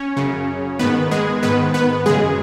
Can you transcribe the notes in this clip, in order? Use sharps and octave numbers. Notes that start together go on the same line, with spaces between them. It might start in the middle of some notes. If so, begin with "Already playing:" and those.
Already playing: C#4 C#5
F#2 C#3
G#2 D#3 B3 B4
G#3 G#4
G#2 D#3 B3 B4
B3 B4
F#2 C#3 G#3 G#4